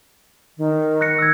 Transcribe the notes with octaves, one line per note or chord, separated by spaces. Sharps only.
D#3
F#6 A#6 C#7
E6 G#6